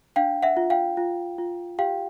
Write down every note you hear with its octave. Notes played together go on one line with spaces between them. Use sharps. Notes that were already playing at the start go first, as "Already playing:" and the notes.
D4 F5 G5
E5 F#5
F4
F5 G5
F4
F4
G4 F5 G5